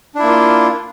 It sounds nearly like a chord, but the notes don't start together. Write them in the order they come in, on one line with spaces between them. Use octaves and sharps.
D4 E4 A#3 F4